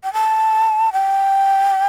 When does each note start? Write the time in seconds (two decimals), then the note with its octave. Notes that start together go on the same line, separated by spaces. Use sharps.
0.03 G5
0.13 A5
0.93 G5